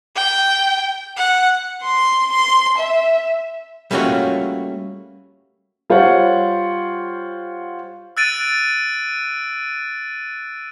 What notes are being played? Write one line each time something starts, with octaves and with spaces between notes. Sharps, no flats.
G5
F#5
C6
C6
E5
G3 A3 A#3 C#4 F4 F#4
G3 F4 C5 C#5 F#5
E6 F#6 A6 D7 D#7